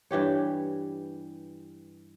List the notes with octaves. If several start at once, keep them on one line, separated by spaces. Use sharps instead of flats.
G2 E3 G4 C#5